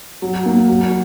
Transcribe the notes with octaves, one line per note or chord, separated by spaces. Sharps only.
F#3
A#3
F#3